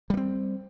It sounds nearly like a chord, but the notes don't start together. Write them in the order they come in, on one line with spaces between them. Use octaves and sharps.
G3 A#3 C4